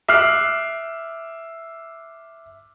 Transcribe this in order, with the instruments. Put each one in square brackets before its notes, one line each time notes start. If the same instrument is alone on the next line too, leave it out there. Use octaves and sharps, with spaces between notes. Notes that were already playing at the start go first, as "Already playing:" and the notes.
[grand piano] E5 D6 F6 F#6 C7